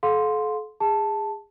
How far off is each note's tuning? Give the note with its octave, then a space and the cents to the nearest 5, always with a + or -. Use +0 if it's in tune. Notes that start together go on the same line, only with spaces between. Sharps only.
A4 -40 F5 +35 C6 +0
G#4 -25 A5 +0